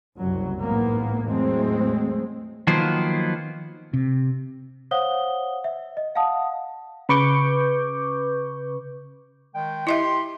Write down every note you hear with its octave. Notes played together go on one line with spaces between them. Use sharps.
F#1 C2 F#3
A1 G#2 A#3 B3
E2 A2 F#3 G#3 A3 C4
D#3 F3 F#3 A#3 B3 C5
C3
C5 C#5 F5 F#5 D#6 G7
E5
D#5
F5 F#5 A5 D#6
C#3 B4 C#6 D6 G6
D#3 G#3 G5
E4 G4 D#5 E5 B5 C6